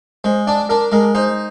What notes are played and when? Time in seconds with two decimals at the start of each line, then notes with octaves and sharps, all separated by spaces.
0.24 G#3 C5
0.47 D4 D5
0.69 D4 A#4
0.92 G#3 A#4
1.15 D#4 C5